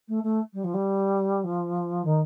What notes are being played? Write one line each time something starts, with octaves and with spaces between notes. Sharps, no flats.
A3
A3
G3
F3
G3
F3
D#3